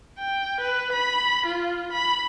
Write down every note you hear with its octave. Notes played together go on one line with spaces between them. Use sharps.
G5
B4
B5
F4
B5